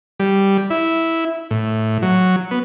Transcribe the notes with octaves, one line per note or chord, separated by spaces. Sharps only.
G3
E4
A2
F#3
B3